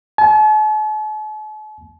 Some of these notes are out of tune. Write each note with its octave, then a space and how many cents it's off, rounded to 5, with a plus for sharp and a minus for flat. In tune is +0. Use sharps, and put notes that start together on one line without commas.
A5 -45